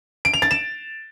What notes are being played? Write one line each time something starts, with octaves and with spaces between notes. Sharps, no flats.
D7
F7
A6
E7